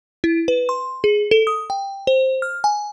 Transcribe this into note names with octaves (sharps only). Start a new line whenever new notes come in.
E4
B4
C6
G#4
A4
D#6
G5
C5
F6
G#5